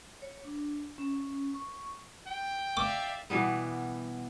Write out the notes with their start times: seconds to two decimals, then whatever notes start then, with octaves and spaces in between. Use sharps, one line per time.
0.22 C#5
0.45 D4
0.98 C#4
1.54 C#6
2.27 G5
2.77 D5 E5 F5 D6
3.30 B2 E3 G3 B3